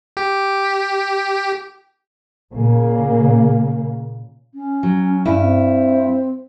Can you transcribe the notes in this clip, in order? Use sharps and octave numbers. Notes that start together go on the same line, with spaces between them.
G4
A#2 C#3 A#3
C#4
F#3
G2 E4
C4